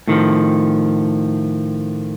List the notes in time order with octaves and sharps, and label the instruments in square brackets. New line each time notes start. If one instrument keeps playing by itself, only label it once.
[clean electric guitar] A2 D#3 F3